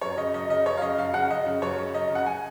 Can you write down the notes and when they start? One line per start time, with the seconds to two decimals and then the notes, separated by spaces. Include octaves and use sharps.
0.01 F#2 C#5
0.17 C#3 D#5
0.34 F#2 D#5
0.49 C#3 D#5
0.66 F#2 C#5
0.77 F5
0.82 C#3 D#5
0.98 F#2 F5
1.14 C#3 F#5
1.30 F#2 D#5
1.46 C#3
1.62 F#2 C#5
1.78 C#3
1.94 F#2 D#5
2.10 C#3
2.15 F#5
2.26 G#5